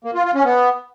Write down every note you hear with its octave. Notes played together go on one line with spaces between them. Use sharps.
A#3
F4
F4
C#4
B3